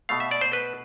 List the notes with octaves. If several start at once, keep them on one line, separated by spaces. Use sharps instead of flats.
B2 A3 F5
E5
D5
C5
B4